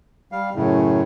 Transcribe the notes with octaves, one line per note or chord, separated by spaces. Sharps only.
G3 F5
F#2 A2 C#3